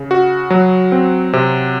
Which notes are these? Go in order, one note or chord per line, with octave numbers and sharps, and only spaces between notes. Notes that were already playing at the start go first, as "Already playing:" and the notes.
Already playing: C#3
F#4
F#3
C4
C3